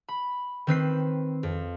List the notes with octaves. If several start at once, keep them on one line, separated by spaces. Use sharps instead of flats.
B5
D#3 C4 B4 C7
F2